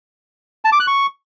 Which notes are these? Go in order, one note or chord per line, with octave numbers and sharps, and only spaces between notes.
A5
D6
F#6
C#6